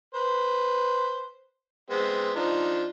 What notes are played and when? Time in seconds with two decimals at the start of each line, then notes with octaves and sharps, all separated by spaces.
0.14 B4 C5
1.90 G#3 B3 C4
2.36 F3 D4 D#4